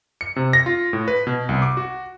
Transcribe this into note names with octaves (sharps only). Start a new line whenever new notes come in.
C#7
C3
A#6
F4
A2
B4
B2
C2
D6
F#4